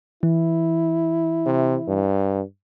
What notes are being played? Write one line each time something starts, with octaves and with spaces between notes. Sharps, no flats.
E3 E4
C3
G2